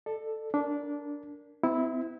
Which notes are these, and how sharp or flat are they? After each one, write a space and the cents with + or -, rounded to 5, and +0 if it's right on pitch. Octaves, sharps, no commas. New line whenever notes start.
A4 +0 D5 +30
D4 -15 A#4 +0
C4 -40 E4 -15